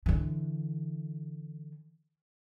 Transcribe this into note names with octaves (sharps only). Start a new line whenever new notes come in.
D3 E3